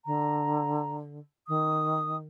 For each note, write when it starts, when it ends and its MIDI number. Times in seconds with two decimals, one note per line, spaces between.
0.05 1.19 50
0.05 0.97 82
1.48 2.26 51
1.48 2.16 87